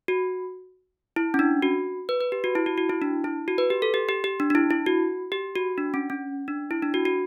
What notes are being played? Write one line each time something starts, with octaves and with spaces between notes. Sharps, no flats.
F#4
E4
C#4
D4
F#4
B4
B4
G4
F#4
E4
F#4
F#4
E4
D4
E4
F#4
B4
G4
A4
G4
G4
G4
D4
D4
E4
E4
F#4
G4
F#4
D4
C#4
C#4
D4
E4
D4
F#4
F#4